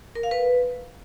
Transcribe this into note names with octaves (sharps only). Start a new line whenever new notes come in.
A#4
F5
B4